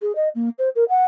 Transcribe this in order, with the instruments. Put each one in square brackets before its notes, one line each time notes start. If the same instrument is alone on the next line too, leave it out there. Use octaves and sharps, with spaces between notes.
[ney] G#4
D#5
A#3
C5
A#4
F#5